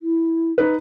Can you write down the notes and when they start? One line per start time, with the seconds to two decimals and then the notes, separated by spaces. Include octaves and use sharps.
0.01 E4
0.58 D#4 B4